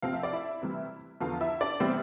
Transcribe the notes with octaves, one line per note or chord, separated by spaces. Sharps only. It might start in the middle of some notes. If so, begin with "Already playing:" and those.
C3 F3 C4 F5
E5
D5
E4 E5
C3 E3 G3
E2 D3 F3 B3 F4 F5
E4 E5
D4 D5
C3 E3 G3 B3 C4 C5